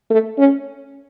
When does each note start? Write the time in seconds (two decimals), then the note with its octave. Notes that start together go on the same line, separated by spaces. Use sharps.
0.10 A3
0.38 C#4